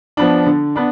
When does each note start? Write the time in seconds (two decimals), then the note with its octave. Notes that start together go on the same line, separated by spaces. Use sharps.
0.17 F3 B3 D4
0.46 D3
0.76 B3 D4